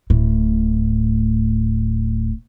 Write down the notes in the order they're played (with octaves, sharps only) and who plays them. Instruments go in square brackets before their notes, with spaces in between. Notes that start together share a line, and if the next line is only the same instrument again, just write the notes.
[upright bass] D1 A2